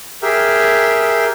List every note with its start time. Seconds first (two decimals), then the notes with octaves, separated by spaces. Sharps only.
0.22 G4 G#4 A#4 E5 G5